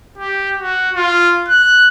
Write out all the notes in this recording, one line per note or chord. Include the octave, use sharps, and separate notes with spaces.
G4
F#4
F4
F#6